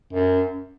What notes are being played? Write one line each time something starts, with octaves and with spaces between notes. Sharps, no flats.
F#2